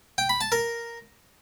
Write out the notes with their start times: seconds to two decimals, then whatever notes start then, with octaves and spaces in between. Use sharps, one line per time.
0.18 G5
0.29 B5
0.41 A5
0.52 A#4